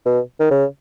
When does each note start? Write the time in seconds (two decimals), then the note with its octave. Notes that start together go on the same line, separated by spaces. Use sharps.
0.05 B2
0.40 D#3
0.50 C#3